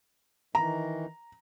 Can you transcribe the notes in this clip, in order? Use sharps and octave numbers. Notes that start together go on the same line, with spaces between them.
D#3 E3 A#5